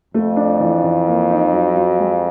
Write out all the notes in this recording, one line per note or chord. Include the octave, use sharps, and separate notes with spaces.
F2 A3
D4
E3
E3
A#3
D#4
F#3
F#3
G#3